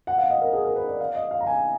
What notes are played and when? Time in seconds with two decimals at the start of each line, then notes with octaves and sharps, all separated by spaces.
0.07 F#5
0.18 F5
0.30 D#5
0.41 A#4
0.53 G#4
0.65 A#4
0.76 B4
0.87 D5
1.00 F5
1.15 D#5
1.31 F5
1.41 A#5
1.47 G#5